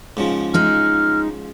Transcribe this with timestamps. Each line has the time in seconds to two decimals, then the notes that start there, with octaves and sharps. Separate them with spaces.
0.17 G#2 C#3 F3
0.54 G#3 D#4 F6